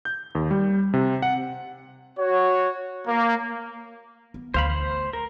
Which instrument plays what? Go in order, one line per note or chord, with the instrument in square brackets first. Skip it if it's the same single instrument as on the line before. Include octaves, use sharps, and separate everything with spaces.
[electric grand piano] G6
D#2
G3
C3
F#5
[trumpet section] F#4 C#5
A#3
[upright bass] B3
[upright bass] D2 E3 [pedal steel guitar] C5 F5 B5
[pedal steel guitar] C5
A#4